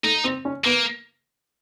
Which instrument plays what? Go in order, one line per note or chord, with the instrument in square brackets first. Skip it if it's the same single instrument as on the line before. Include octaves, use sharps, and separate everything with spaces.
[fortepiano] A3 [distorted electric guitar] D#4
[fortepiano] C4
C#4
[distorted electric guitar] A#3 [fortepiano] B3